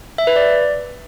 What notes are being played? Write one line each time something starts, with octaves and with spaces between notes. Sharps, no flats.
E5
B4
D5